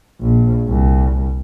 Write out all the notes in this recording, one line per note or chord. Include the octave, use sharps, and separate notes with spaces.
A#1
C2